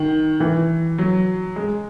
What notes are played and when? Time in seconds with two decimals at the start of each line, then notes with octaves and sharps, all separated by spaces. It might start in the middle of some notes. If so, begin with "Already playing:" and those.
Already playing: D#3
0.40 E3
0.98 F#3
1.56 G#3